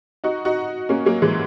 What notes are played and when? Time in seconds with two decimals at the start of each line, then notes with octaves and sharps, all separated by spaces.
0.24 D#4 F#4
0.45 D#4 F#4
0.89 A#3 C#4
1.06 F#3 A#3
1.22 E3 G#3